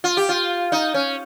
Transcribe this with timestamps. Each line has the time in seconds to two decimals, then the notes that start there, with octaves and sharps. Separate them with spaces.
0.04 F4
0.17 G4
0.29 F4
0.72 D#4
0.94 C#4